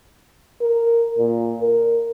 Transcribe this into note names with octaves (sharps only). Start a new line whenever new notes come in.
A#4
A#2
A#4